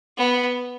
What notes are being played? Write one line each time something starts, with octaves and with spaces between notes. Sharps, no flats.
B3